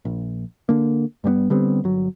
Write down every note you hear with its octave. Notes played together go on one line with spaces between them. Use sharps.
A#1
D3 A#3
G2 G3 A#3 B3
D3 G3 B3 C4
G1 F#3